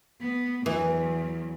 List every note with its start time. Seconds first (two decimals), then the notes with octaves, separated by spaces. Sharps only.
0.21 B3
0.66 E2 E3 F#3